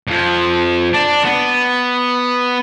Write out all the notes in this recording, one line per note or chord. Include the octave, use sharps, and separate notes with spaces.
F2 F3
D4
B3